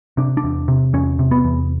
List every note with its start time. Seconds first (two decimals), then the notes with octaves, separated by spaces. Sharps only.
0.17 C3 D4
0.37 D4
0.44 E2
0.68 C3
0.93 E2 C#4
1.19 C3
1.31 B3
1.44 E2